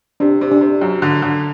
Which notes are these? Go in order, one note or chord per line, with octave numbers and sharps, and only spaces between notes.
C3 D4
C3
D4
C3
F#2
D3
D3